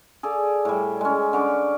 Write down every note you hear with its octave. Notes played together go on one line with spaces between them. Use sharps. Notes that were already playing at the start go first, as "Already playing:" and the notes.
G#4 A4 D5 F5
A2 G3
G#3 C#4
D3 C#4 D6